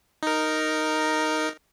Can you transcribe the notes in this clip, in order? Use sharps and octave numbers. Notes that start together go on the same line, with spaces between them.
D#4 A#4